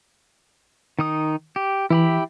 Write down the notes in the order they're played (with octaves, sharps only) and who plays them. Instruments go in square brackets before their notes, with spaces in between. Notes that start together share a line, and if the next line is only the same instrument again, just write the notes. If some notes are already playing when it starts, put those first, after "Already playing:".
[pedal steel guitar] D#3 D#4 D#6
G4
[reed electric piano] E3 [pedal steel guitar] E4 G4 B5